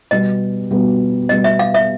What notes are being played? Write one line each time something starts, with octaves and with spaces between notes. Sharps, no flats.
B2 G3 B3 D#5
B2 G3 B3
B2 G3 B3 D#5
E5
F5
E5